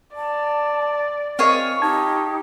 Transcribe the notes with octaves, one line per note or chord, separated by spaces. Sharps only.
D5 A5
C4 F4 G#4 A#4 C#5 D#5 C#6
D#4 G4 A5 G#6